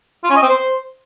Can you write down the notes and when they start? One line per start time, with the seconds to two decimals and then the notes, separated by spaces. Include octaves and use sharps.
0.24 F4
0.30 C#4
0.36 D#5
0.42 C4
0.48 C5